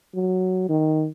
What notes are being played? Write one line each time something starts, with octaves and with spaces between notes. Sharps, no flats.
F#3
D#3